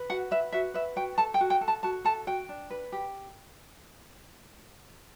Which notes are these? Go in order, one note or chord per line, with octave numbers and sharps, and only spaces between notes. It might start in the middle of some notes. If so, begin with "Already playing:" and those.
Already playing: B4
F#4 F#5
B4 E5
F#4 E5
B4 E5
F#4 G5
A4 A5
G5
F#4
G5
A4
A5
F#4 A5
A4 A5
F#4 G5
D4
B4
G4